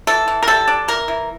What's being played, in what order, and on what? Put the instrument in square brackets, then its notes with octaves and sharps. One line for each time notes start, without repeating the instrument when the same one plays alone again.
[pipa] E3 A4
E3
A#4
G3 A4
D4
E3 A#4
E3